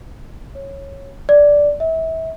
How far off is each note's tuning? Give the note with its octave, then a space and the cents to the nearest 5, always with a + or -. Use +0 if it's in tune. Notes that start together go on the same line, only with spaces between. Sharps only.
C#5 -10
D5 -5
E5 -30